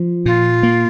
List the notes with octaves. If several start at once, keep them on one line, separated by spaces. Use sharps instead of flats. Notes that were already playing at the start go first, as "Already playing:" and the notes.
Already playing: F3
A#2 F4
A#3